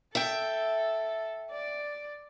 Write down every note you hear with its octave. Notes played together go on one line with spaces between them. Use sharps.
A4 E5 G5
D5